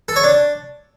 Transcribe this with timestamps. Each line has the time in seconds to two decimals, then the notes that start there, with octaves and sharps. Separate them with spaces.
0.08 A4
0.16 C#5
0.24 D4